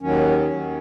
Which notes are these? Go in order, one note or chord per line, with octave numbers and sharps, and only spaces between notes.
D#2 D#3 F#3 C#4
D#2 D#3 F#3